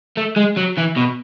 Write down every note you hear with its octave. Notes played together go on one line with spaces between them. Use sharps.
A3
G#3
F#3
E3
B2